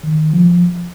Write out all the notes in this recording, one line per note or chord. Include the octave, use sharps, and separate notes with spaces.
D#3
F3